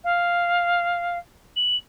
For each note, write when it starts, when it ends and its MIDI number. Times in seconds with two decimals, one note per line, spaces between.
0.04 1.17 77
1.56 1.76 102